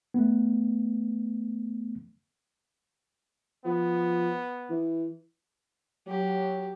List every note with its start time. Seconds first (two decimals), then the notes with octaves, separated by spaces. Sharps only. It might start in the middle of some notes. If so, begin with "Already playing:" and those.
0.14 A3 B3
3.65 F3 B3
4.70 E3
6.08 F#3 G4